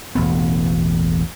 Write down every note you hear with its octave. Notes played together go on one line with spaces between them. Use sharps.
E1 A1 B3